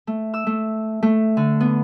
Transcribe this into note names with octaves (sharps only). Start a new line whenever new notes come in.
A3
E6
A3
A3
D3
B3